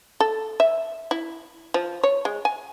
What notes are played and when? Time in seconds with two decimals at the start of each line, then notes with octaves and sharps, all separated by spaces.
0.20 A4
0.60 E5
1.11 E4
1.74 F3
2.03 C#5
2.25 G#3
2.45 G#5